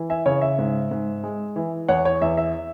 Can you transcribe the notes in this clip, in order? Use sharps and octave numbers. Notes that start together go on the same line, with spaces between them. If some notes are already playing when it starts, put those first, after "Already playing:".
Already playing: E3
E5 G#5
C#3 C#5
E5
G#2
G#2
G#3
E3
E2 C#5 F#5
C#5
E2 E5
E5